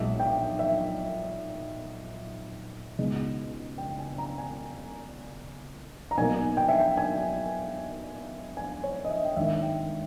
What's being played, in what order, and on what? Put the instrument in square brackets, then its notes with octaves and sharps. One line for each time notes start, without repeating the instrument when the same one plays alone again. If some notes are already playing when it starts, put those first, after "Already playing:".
Already playing: [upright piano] B1 A#2 G#3 E5
G5
E5
C#2 B2 G#3 D#4
G5
G#5
A#5
G#5
A#5
B1 B2 A#3 D#4 G#5
G5
E5
G5
G#5
G#5
C#5
D#5
E5
G5
G#1 G2 D#3 A#3 E5
E5
G5